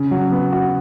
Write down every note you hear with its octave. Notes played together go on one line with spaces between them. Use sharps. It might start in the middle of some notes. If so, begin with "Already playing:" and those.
Already playing: C#3
F#3
B3
F#4